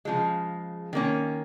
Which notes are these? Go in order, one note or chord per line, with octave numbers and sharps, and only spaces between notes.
C#3 F3 G#3
D#3 A#3 C#4